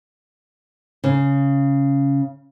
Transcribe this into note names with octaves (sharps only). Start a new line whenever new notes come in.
C#3